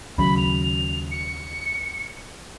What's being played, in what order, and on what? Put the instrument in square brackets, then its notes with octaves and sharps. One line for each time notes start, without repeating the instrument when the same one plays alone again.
[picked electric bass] D#2 C#3 F#3 [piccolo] B5
[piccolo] F7
C#7